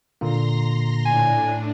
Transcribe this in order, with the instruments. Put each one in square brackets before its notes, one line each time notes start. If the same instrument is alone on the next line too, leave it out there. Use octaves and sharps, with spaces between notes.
[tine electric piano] A#2 D3 A#3 [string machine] A#5 C6 A#6
[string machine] A2 D4 [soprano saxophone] G#5